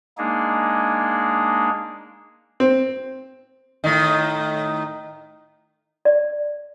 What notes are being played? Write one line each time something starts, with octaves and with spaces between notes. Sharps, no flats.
G#3 A#3 D4 D#4 G#4
C4
A2 D#3
D5